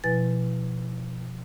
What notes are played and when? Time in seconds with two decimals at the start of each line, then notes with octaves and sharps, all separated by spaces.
0.04 B2 F3 E4 B4 G#5 A6